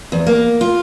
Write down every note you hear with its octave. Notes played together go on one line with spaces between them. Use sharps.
E2
A#3
F4